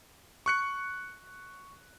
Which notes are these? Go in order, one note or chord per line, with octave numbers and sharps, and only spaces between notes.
C#6 F#6 C#7